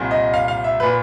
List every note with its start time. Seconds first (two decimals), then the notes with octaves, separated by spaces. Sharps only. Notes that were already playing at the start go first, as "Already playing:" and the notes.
Already playing: C2 A#2
0.11 D#5
0.34 F5
0.48 F5
0.64 E5
0.80 A#2 B4